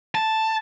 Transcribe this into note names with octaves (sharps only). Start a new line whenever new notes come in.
A5